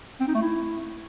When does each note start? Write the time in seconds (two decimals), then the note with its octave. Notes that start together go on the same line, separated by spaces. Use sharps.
0.20 C4
0.28 D#4
0.35 A3
0.42 E4